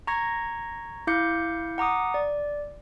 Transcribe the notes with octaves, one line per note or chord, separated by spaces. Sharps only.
A#5 C#6 G#6 A#6
E4 F5 D6 G6 C#7
F#5 A#5 D6 D#6
D5